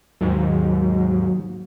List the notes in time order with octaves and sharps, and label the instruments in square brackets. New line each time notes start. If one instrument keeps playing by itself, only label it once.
[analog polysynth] D#2 G#2 [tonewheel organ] F#3